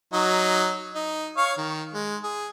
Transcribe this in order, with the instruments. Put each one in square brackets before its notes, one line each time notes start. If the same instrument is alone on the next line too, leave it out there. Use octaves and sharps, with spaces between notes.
[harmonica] F#3 D#4
D#4
C#5 F5 C#6
D#3
G#3
G#4